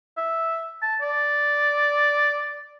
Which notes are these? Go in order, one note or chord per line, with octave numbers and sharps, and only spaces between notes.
E5
A5
D5